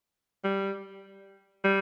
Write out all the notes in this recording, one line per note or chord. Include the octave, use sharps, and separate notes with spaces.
G3
G3